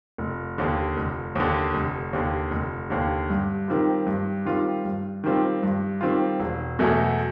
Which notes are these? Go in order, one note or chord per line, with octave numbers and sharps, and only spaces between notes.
F1
D#2 D3
F1
D#2 D3
F1
D#2 D3
F1
D#2 D3
G2
D#3 G3 C4 F4
G2
D#3 G3 C4 F4
G2
D#3 G3 C4 F4
G2
D#3 G3 C4 F4
E1
E2 B2 F#3 A3